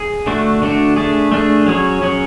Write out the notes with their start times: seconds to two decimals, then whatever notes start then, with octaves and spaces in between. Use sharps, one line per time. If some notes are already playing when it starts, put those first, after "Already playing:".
Already playing: G#4
0.27 D3 A3 D4 F#4
0.62 D3 A3 D4 F#4
0.96 A3 D4 G#4
1.32 A3 D4 G#4
1.67 F#3 C#4 G#4 C#5
2.02 F#3 C#4 G#4 C#5